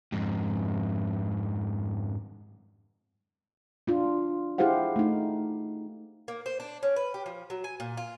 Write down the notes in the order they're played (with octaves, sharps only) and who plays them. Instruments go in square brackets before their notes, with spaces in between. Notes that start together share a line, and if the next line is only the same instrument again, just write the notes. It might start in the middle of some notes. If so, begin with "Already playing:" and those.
[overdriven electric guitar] F2 G#2
[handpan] D4 F4
E4 G4 G#4 C5 F5 F#5
A3 D#4
[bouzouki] A#3
C5
D4
C#4
B4
G4
F3
F#3
G#5
A#2
F4